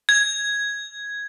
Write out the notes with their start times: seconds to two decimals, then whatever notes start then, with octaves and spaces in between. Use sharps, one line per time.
0.09 G#6